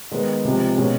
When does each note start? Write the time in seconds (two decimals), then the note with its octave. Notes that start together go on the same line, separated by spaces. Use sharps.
0.11 D#3 G#3 B3
0.45 C#2 C3 F3
0.78 B2 G#3 C#4